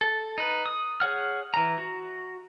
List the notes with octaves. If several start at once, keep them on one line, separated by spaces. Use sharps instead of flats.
A4
D#4 B4
D#6
G#4 C#5 F#5 F6
E3 A#5
F#4